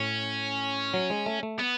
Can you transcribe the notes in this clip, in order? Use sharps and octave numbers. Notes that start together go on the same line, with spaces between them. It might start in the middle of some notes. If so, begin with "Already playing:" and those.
Already playing: A2 C#4
F#3
G#3
A3
A3
B3